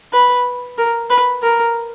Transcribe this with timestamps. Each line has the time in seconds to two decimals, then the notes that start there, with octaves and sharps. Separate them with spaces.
0.13 B4
0.78 A#4
1.10 B4
1.42 A#4